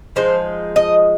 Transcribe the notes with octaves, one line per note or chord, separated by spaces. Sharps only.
F3 G#3 D#4 C5
D#5